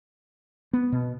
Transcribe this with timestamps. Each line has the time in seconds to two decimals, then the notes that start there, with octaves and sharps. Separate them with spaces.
0.73 B3
0.92 B2